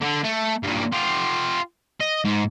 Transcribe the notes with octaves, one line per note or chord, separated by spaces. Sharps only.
D3
A3
G2 A#2
F4 G4
D#5
G#2